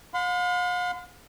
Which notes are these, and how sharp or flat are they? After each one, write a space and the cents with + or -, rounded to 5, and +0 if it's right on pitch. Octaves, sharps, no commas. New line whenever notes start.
F5 +45 C6 -45